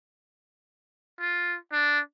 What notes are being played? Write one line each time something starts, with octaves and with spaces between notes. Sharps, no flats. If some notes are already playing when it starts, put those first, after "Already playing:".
F4
D4